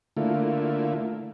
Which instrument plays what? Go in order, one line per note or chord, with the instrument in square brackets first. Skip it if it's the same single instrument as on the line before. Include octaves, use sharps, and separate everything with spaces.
[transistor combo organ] D3 A3 A#3 E4 F4